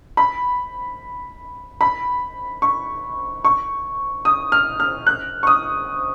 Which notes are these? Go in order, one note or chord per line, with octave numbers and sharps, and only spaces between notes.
B5
B5
C#6
C#6
D#6
F6
F6
F#6
C#6
D#6